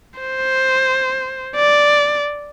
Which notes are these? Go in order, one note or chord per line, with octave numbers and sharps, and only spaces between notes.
C5
D5